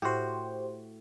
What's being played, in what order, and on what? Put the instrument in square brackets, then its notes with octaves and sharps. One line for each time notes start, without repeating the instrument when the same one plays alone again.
[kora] A2 F#4 [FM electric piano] G4 C5